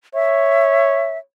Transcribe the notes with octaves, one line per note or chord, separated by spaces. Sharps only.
C#5 E5